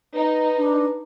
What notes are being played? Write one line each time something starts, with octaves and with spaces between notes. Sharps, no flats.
D#4 B4
D4